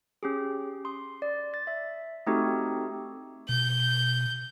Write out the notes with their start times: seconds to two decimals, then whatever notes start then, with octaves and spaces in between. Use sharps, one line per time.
0.23 C#4 G4 G#4
0.85 C6 D#6
1.22 D5
1.54 A6
1.67 E5
2.27 A3 C4 D#4 F#4 G4 A4
3.49 B2 G6